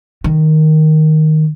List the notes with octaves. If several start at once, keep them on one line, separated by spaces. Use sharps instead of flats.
D#3